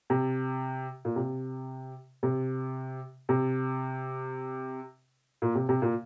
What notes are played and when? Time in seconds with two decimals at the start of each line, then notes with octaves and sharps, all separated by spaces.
0.10 C3
1.05 A#2
1.16 C3
2.23 C3
3.29 C3
5.42 A#2
5.55 C3
5.69 C3
5.82 A#2